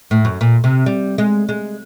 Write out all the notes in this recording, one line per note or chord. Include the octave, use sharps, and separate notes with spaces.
A2
F#2
A#2
C3
G3
G#3
G#3